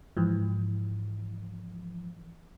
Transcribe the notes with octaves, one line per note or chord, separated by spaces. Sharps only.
G#2 E3 F3